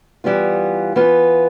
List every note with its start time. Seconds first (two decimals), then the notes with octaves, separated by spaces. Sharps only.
0.24 E3 G3 B3 F4
0.96 E3 B3 F4 B4